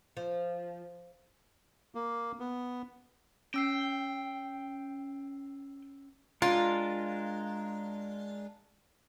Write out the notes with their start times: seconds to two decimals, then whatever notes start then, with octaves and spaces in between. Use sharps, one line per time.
0.17 F3
1.95 A#3
2.40 B3
3.54 C#4 G5 E6 C7
6.42 G#3 D4 F4 A#4